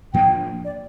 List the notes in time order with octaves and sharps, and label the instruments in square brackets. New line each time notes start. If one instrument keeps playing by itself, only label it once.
[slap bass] A2 F3 A#3 D4 [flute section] G5
[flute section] D5